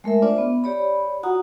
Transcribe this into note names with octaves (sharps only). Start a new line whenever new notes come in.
G#3 A3 A#4 E5
D4 F4 C5 D5 E5
B3
G4 C#5 D5 B5
F4 F#4 F#5 A#5 D#6